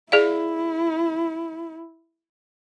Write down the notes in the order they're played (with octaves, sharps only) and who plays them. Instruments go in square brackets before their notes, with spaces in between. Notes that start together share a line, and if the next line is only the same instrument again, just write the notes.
[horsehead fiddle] E4 [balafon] G#4 D5 F5